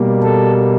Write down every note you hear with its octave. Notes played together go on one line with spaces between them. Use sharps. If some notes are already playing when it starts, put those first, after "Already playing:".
Already playing: B2 G3 A#3
A4